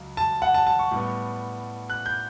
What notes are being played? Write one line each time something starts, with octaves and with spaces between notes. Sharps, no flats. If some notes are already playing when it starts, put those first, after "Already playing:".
Already playing: C#2 F#3
A5
F#5
A5
A5
C#6
A2 G3 B3
F#6
G6